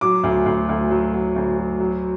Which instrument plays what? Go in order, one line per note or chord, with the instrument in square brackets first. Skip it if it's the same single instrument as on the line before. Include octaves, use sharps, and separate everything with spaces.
[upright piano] F#3 D6
D2
D2
D2
F#3
F#3
D2
F#3
F#3